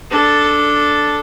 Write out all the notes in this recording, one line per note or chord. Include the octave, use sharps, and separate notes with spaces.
D4 A4